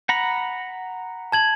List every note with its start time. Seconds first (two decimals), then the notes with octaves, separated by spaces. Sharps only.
0.09 F#5 A#5 B5
1.32 A5 G#6 F#7